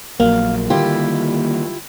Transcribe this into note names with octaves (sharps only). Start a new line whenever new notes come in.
A#1 F#3 A#3 F5
D3 D#3 G3 E4 F4 G4